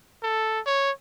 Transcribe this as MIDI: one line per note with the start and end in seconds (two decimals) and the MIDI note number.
0.23 0.60 69
0.66 0.91 73